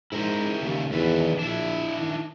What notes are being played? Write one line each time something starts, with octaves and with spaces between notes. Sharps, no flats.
G#2 E4 A#4 C5
D#2 C#3 A3
E2 D#3 A4 B4
A#1 D4 E4
D#3